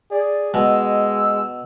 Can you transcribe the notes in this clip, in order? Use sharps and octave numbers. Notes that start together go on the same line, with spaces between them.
G#4 D5
B2 G#3 E6